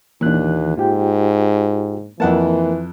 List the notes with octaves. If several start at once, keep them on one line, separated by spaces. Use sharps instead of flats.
D#2 A#2 E3 D4 F#6
G#2 F4 G4 G5
F2 E3 A#3 A#4 F#5 A5